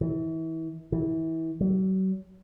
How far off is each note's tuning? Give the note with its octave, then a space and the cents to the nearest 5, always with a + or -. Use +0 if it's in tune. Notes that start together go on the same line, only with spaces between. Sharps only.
E3 -30
E3 -30
F#3 +40